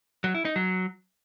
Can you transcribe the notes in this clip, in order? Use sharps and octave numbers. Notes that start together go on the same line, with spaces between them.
F#3
E4
D#4
F#3